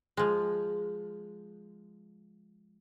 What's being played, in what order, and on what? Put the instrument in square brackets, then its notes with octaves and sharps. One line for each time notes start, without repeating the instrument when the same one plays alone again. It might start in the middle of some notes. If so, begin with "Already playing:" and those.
[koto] F3 G#3